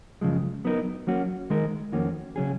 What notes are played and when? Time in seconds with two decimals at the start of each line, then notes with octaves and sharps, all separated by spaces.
0.21 F#2 C#3 F3 G#3
0.64 F#3 B3 D#4 A#4
1.07 F#3 A#3 C#4 F#4
1.50 D#3 G#3 D#4 A#4
1.92 F2 D#3 A#3 C#4 F#4
2.36 C#3 F#3 C#4 G#4